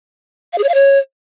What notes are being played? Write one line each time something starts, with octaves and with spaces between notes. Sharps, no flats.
F5
G#4
C#5
F5
C#5